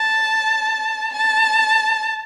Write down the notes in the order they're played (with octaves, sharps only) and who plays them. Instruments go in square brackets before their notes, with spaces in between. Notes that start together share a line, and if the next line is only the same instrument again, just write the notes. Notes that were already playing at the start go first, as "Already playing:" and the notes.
Already playing: [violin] A5
A5